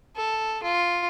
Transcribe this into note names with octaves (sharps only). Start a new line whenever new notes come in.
A4
F4